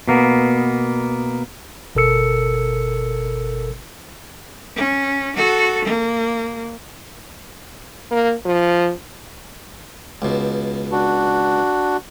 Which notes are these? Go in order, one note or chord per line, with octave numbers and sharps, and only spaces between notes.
B2 A#3 B3
G1 B2 A4 A#4 E6 C#7
C#4
F#4 A4
A#3
A#3
F3
C#2 B2
D4 F#4